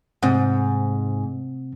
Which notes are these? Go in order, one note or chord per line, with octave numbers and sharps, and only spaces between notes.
G#2 C3 C4 F#5